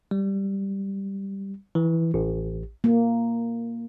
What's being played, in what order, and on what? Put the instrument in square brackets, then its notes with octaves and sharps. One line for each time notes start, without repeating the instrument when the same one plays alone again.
[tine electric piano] G3
E3
A1
[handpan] A#3